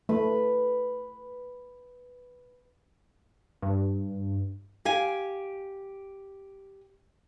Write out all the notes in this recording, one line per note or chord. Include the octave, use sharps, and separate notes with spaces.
A3 B4
G2
G4 F5 G#5